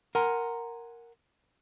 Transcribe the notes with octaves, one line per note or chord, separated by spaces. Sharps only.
A#4 F#5 G#5 A#5 C6